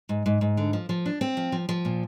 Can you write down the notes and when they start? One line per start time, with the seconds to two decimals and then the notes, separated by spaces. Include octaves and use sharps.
0.09 G#2
0.26 G#2
0.41 G#2
0.57 D3
0.73 F3
0.89 F3
1.06 D4
1.21 C4
1.37 F3
1.52 F3
1.69 F3
1.85 A#2